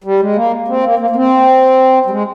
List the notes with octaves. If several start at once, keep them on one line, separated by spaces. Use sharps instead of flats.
G3
G#3
A#3
C4
A#3
A#3
A#3
C4
G3
G#3